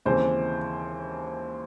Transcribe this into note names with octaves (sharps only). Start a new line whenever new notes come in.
D#2 C#3 E3 G#3 C4 C5